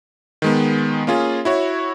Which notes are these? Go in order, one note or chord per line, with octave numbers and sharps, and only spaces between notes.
D#3 G#3 B3
A#3 C#4 F4 G#4
E4 F#4 C#5